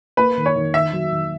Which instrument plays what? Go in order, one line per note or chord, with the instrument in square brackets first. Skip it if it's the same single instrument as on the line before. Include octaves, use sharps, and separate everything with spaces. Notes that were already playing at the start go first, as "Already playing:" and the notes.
[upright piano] A#3 [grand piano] B4
[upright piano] D#3
[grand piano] C#5
[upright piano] D#3
[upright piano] D#3 [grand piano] E5
[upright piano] F#3
D#3